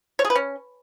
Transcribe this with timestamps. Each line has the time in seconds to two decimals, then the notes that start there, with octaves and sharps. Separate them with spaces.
0.19 C#5
0.25 G#4
0.30 B4
0.36 C#4